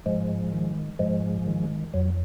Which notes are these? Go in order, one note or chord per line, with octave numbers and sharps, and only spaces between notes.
G#2 F3 G#3
D#3
G#2 F3 G#3
D#3
F2 F#3